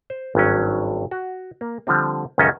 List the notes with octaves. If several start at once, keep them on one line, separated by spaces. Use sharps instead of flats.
C5
G#1 G2 F#3 C#4
F#4
A#3
D3 F3 G3 C4
C#2 F#2 D#3 C#4 A4 D#5